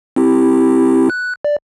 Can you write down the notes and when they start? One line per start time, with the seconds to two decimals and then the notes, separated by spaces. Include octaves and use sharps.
0.16 C4 E4 G4
1.10 F#6
1.45 D5